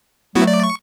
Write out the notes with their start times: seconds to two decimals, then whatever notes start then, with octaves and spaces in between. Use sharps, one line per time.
0.35 F#3 A3 B3 E4 F#4
0.47 D5
0.63 C#6